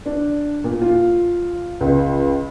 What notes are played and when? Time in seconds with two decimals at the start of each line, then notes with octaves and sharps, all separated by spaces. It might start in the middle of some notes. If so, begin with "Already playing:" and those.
0.06 D4
0.64 A#2
0.82 F4
1.81 C#2